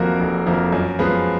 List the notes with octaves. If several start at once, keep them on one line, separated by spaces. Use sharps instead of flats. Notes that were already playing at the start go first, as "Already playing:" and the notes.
Already playing: F1 F2 F3 A#3 F#4 A#4
F1
F2 F3 A#3
F#2
F3 G#3 B3